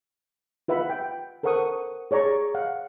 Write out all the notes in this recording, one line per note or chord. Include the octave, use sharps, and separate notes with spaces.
F4 B4 E5 F#5 B5
G5
A4 A#4 C5 F#5 C#6 D#6
G#4 C#5 D5 A#5 C#6
F5 F#5